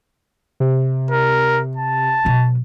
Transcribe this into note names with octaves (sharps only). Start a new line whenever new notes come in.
C3
A#4
A5
B2 F#3